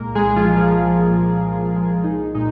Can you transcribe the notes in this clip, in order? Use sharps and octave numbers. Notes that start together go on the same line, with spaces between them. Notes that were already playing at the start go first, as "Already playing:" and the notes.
Already playing: C2 A#2 G#3 A#3 A#4
C2 G#3 G#4
F3 F4
A#2 G#3
F3 F4
C2
A#2 G#3
C2
A#2 G#3
C2 D#4
A#2 G#3 D#4